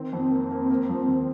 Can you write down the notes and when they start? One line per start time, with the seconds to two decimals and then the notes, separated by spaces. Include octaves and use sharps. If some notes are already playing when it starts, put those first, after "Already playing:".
Already playing: D#3 C4
0.13 F2
0.31 A#3
0.51 A#3
0.71 A#3
0.89 F3
1.08 D#2